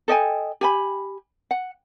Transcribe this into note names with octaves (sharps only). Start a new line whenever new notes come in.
A4 D#5 G5 G#5
G4 G#5 B5
F#5